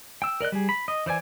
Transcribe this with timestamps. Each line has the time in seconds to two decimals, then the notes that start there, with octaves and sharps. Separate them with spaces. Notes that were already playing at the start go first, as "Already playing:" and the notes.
0.22 G5 E6
0.40 A#4 D5 D#5 F#6
0.52 G3 G#4
0.69 B5
0.88 D#5
1.06 E3 C5 D5 G#5